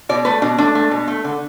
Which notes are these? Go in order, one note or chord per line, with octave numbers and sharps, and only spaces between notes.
B2 D5
A3 B4
B2 D4
A3 D4
A3
B2
A3
D3